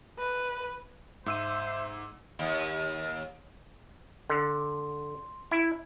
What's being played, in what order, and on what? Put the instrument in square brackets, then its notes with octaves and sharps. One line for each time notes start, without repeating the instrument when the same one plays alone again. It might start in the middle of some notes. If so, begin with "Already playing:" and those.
[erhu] B4
[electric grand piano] G#2 E6 D#7 [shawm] C5 [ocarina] E5
[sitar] D#2
[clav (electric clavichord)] D3 [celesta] C6
[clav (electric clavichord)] E4